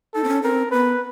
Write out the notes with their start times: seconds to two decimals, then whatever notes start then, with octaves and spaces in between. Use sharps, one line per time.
0.14 D#4 A4
0.24 C4
0.28 C#4
0.43 C4 A#4
0.71 B3 B4